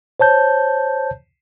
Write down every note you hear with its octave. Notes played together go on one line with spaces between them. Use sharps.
C5 C#5 A5 G6